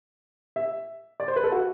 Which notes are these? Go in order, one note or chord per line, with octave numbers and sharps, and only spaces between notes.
E5
D5
C5
B4
A4
F#4